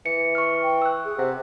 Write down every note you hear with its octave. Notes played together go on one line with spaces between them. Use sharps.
E3 C#7
C#6 F6
G5
E6 F#6
G#4
C3 F#5